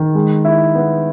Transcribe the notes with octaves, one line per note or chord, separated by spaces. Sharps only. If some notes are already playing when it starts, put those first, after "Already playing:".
Already playing: D#3
G#3
E4
B3